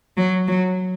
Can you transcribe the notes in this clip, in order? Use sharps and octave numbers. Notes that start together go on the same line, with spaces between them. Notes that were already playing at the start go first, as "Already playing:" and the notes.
F#3
F#3